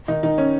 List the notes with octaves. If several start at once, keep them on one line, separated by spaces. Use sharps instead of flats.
D#3 D#4
D#3 D#4
C#4